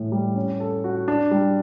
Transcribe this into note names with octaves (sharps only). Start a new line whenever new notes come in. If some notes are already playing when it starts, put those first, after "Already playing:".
Already playing: A2 E3
G3
C#4
A4
F#4
D4
G3